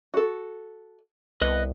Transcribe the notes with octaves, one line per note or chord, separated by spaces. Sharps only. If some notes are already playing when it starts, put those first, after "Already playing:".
F#4 A4
C2 B3 B4 D#5 F#6